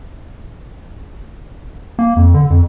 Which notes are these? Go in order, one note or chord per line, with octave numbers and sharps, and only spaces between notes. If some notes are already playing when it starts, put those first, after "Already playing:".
A#3
F2
D3
F2